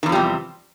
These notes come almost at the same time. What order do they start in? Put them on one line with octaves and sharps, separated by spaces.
D#3 E2 F3 G3 C3